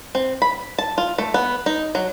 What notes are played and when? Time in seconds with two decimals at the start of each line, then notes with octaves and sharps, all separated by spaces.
0.15 C4
0.42 B5
0.79 A5
0.98 F4
1.18 A3
1.34 B3
1.66 D#4
1.95 F#3